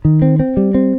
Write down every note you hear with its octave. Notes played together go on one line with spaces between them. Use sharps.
D#3
C4
C4
G3
C4